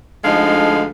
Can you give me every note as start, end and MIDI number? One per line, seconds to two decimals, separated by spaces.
0.24 0.86 38
0.24 0.86 50
0.24 0.86 53
0.24 0.86 56
0.24 0.86 63
0.24 0.86 77